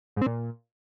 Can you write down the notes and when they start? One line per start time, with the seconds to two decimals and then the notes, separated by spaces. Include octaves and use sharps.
0.16 G#2
0.21 C4
0.26 A#2